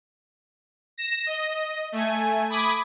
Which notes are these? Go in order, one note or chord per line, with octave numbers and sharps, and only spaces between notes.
A#6 E7
D#5
A3 G#5
B5 D6 D#6 G#6